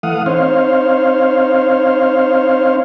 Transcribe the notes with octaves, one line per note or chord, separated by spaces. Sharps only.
E3 A3 F5 F#5 D#6
C4 D#4 C5 C#5 F5